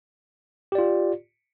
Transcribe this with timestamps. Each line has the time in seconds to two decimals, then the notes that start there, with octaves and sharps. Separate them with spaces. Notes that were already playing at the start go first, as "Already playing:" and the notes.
0.72 G4
0.75 D5
0.78 F4